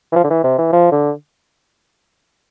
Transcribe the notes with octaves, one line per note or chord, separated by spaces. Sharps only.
E3
F3
D3
E3
C3
E3
F3
D3